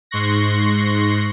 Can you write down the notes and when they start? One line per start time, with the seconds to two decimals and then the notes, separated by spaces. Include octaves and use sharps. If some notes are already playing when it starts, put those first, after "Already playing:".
0.11 G#2 C6 C#6 F#6 A#6